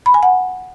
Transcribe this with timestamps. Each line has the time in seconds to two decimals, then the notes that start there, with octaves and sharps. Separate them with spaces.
0.06 B5
0.14 G#5
0.23 F#5